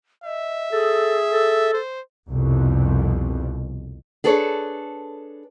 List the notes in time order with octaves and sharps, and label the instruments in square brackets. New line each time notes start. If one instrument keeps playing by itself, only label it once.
[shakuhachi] D#5 [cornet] E5
[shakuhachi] G#4 [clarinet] A4
[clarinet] A4
[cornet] C5
[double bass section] C2 F2 B2
[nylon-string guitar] D4 G#4 A4 B4 C#5